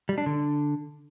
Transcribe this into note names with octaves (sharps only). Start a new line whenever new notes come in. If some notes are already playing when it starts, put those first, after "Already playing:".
G3
D4
D3